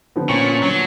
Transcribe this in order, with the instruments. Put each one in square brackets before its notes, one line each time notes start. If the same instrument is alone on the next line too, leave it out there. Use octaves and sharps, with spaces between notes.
[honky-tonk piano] D3 F3 B3
[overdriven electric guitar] A#2 [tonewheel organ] C#4 C#6
[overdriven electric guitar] F#3